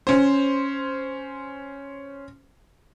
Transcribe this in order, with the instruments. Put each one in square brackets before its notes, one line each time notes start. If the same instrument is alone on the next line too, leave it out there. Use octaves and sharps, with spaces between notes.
[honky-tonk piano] C#4 C5